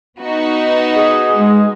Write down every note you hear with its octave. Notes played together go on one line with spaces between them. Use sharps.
B3 D#4 F#4
G#4
G#3